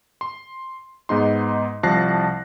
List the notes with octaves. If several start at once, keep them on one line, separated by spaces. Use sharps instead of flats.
C6
G#2 B3 D#4 C6
C2 F3 A5 F#6 A#6 C7